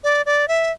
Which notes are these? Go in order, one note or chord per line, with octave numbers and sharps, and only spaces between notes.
D5
D5
E5